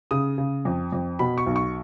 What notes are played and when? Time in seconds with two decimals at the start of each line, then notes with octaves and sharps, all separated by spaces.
0.11 C#3 D#6
0.38 C#3
0.65 F2
0.92 F2
1.19 B2 B5
1.38 C#6
1.47 B1
1.56 C#6